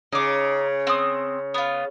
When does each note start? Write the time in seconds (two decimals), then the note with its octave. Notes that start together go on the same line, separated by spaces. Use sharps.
0.12 C#3 D#4 D6
0.87 C4 D#6
1.54 B3 F4